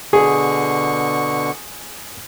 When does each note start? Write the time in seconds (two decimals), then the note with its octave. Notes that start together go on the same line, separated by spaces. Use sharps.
0.13 B2 D3 G#4 C#6